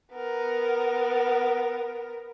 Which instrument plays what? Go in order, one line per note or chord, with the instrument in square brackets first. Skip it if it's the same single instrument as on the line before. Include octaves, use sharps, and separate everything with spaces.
[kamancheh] B3 A#4